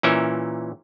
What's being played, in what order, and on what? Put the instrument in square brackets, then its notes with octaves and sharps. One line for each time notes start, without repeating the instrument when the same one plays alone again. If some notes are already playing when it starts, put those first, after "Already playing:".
[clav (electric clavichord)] A#2 E3 C#4 A#4 E5